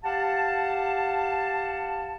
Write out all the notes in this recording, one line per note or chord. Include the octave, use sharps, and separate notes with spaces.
G4 F5 F#5 A5